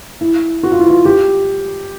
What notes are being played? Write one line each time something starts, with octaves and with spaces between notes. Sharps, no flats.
E4
F#4
F4
E4
F4
G4